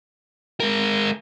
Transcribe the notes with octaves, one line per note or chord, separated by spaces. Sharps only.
G#3 A#4